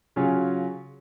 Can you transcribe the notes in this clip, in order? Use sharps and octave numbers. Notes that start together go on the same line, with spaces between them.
C#3 F#3 C#4 F4